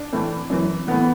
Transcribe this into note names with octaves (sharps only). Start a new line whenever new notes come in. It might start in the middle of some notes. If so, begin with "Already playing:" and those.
Already playing: D4
A2 E3
F#2 E3
A2 E3 B3